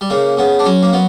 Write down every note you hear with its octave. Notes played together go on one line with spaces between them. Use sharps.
G3
C#3 A#3
C#3 B3
D4
F#3 C#4
A#3
F#3 B3